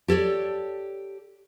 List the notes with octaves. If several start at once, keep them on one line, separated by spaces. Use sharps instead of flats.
G4 A4 C#5 D5